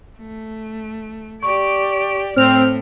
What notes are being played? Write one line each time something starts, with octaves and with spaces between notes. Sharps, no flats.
A3
G4 D5 C#6
A2 C4 F6 F7